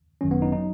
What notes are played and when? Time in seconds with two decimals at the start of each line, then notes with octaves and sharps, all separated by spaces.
0.21 G#1 F#2 D#3 F#3 C#4
0.31 B3
0.42 D#4
0.52 F#3 D#4